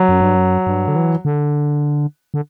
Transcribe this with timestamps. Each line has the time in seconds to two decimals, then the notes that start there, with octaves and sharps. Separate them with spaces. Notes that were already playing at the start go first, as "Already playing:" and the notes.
Already playing: F#3
0.09 F#2
0.21 G2
0.35 F#2
0.67 G2
0.88 D3
0.96 E3
1.25 D3
2.34 D3